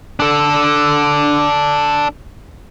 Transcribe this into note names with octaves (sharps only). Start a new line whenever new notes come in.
D4 A4